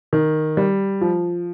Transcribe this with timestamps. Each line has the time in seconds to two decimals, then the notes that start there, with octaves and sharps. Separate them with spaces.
0.13 D#3
0.57 G3
1.01 F3